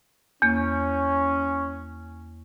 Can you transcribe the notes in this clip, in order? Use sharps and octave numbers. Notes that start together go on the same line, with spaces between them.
E2 A#3 C#4